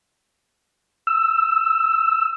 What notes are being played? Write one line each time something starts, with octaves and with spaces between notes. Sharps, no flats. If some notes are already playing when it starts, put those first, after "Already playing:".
E6